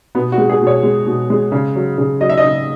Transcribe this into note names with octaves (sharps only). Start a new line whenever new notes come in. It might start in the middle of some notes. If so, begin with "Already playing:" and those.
B2 B3
F#4
G#3
G#4
B2
C#5
G#3
B2
G#3
C#3
F#3
C#3
F#3 D#5
E5
D#5
C#3